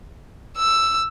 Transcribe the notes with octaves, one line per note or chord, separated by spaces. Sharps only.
E6